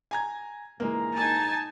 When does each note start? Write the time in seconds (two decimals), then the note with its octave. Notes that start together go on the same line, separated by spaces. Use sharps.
0.11 G#5 A#5 G#6
0.80 A#1 G#2 E3 G#3 A#3 A#5
1.15 D#4 G#5 A5